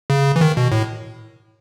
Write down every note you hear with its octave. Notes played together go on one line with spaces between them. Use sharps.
C#3
E3
D#3
B2
A2